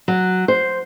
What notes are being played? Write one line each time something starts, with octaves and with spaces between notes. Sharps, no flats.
F#3
C5